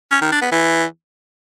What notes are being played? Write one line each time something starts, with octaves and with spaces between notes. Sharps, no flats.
C#4
D#3
D4
B3
E3